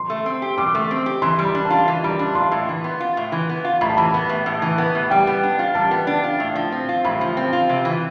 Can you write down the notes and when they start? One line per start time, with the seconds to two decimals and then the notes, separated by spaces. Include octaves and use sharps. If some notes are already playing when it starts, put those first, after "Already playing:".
Already playing: C6
0.10 A3
0.26 C4
0.42 G4
0.58 B2 D6
0.75 A3
0.91 C4
1.06 G4
1.22 E3 C6
1.39 G3
1.45 B5
1.55 D4
1.65 A5
1.70 F4
1.88 E3
2.04 G3 B5
2.19 D4
2.35 F4 C6
2.51 A2
2.69 E3
2.84 B3
3.00 F4
3.17 A2
3.32 E3
3.49 B3
3.65 F4
3.81 A2 B5
3.90 A5
3.97 E3 B5
4.14 B3
4.29 A2
4.46 A2
4.62 E3
4.78 B3
4.95 A2
5.10 G3 G5
5.27 B3
5.44 D4
5.59 F4
5.75 G3 A5
5.91 B3
6.07 D4
6.24 F4
6.40 A2
6.56 F3
6.72 C4
6.89 F4
7.05 A2 B5
7.21 F3
7.37 C4
7.53 F4
7.69 C3
7.85 E3